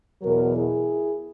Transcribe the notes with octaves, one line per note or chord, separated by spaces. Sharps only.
E2 B2 F#3 F#4 A#4
E4 G#4